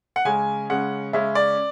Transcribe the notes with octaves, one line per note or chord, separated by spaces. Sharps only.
F#5
C#3 G#3 C#4 G#5
C#3 G#3 C#4 F#5
C#3 G#3 C#4 E5
D5